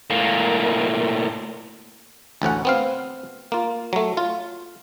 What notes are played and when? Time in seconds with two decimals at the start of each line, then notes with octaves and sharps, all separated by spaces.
0.10 A2 A#3
2.42 A1 D2 C#4 F#5
2.65 B3 C4 F5
3.52 A#3 F4
3.93 F#3 A3
4.17 F4